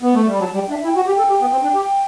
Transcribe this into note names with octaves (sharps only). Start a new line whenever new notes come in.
B3
A3
G3
B5
F#3 A5
G3 G5
D4 E5
E4 G5
F#4 F#5
G4 G5
A4
G4
B3
C4
D4
G4